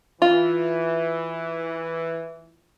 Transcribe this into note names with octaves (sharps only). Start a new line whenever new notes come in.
E3 F4